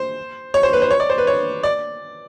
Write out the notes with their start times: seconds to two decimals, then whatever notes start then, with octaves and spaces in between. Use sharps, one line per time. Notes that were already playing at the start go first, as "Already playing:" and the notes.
Already playing: C5
0.54 C#5
0.63 C5
0.73 B4
0.82 C5
0.91 C#5
1.00 D5
1.10 C5
1.18 B4
1.27 C#5
1.63 D5